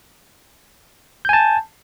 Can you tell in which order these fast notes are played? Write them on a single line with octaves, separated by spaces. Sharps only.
G6 G#5 A5